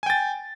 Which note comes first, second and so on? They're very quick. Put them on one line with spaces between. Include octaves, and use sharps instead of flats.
G#5 G5 A6